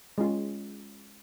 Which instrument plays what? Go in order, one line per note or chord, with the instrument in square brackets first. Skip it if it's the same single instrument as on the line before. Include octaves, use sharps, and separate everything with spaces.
[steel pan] G#3 C#4 F4